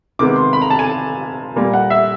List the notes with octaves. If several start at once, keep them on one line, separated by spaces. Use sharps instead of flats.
C3 D#3 G#3 B3 D6
C6
B5
A#5
A5
G#5
A#2 G3 A#3
F#5
E5